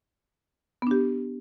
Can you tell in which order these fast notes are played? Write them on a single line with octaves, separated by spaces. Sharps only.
B3 D4 G4